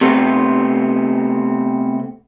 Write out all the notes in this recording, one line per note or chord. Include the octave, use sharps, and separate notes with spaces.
C3 A3 B3 C4